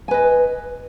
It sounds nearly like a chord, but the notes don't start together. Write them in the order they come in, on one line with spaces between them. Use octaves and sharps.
G#5 B4 D#5